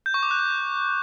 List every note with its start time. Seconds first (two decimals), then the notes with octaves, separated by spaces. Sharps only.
0.06 G6
0.14 C#6
0.23 D6
0.31 F#6
0.39 D6